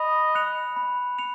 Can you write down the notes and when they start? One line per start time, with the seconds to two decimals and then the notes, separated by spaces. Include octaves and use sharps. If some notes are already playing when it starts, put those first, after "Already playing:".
Already playing: D#5 B5
0.35 F#6 C#7 F7
0.76 B5
1.19 C#7 F7